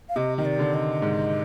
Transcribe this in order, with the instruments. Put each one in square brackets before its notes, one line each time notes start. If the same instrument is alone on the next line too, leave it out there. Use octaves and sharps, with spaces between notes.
[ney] F5
[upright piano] C3 [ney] D#5
[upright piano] D#3 [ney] D#5
[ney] D5
[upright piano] D3
[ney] D#5
[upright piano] G#2